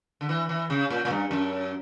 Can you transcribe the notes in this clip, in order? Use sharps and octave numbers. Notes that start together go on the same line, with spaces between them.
D3
E3
E3
C#3
A#2
A#2
G2
F#2